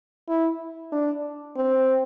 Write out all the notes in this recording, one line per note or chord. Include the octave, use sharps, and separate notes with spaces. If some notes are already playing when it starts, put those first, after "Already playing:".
E4
D4
C4